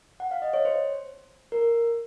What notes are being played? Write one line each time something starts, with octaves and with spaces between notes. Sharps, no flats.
F#5
F5
D#5
C#5
C5
A#4